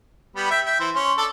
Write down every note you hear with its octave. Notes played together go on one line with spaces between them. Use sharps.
G3 B3
E5 G5
E5 G5
E3 C5
C#4 C6
D4 A4